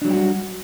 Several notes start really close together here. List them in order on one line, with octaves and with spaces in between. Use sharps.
D4 F#3 G3 G4 F#4